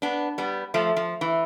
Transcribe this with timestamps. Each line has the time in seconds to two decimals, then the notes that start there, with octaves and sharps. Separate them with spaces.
0.02 B3 D4
0.38 G3 B3
0.74 F3 A3
0.97 F3
1.21 E3